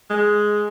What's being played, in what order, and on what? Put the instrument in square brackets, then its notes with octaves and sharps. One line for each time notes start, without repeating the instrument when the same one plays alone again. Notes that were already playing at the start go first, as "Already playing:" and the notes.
[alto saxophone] G#3